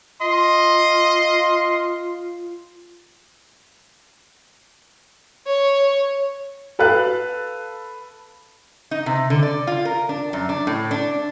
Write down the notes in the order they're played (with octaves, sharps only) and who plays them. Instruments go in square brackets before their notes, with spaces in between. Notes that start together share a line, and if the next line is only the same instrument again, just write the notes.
[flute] F4 [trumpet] D#5 [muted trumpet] C6
[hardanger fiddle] C#5
[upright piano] A4 B4 F5 F#6
[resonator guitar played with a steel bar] D#4
C3
D3
D5
F4
A#4
D4
F#2
D4
A2
D4